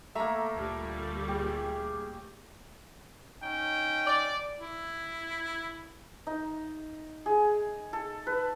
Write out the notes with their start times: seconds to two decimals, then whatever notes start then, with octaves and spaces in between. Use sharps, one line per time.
0.15 A3 A#3 A4 E5 A#5
0.53 D2 A#2 G3
1.28 G4 G#4
3.42 C#4 D#4 G5
4.07 D5
4.58 E4
6.27 D#4
7.26 G#4
7.93 A4
8.27 B4